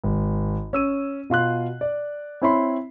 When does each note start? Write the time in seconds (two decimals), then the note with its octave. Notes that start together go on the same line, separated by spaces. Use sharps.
0.04 G#1
0.73 C#4 E6 D#7
1.30 B2 F4 C6 F#6
1.81 D5
2.42 C4 E4 C#5 E5 B5 C6